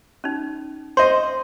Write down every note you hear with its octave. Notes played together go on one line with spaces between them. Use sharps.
C#4 D#4
C5 D#5 G5 C6